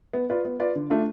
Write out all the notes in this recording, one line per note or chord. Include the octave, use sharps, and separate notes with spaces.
B3
F4 B4 D5
B3
F4 B4 D5
D3
A3 D4 F4